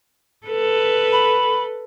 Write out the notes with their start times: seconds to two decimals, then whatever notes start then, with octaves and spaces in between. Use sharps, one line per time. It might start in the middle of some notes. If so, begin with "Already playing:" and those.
0.47 A4 B4
1.12 B5